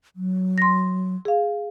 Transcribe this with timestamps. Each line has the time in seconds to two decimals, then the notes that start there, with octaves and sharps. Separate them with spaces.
0.16 F#3
0.58 C6 A#6
1.25 G#4 F5